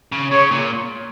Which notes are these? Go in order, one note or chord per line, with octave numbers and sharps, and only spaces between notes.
C#3
C#3 C#5
A#2